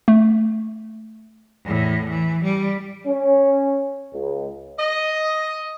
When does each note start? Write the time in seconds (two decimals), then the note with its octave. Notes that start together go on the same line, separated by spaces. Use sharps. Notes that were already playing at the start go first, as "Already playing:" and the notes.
0.08 A3
1.64 E2 A2
2.10 E3
2.44 G3
3.06 C#4
4.13 C#2
4.79 D#5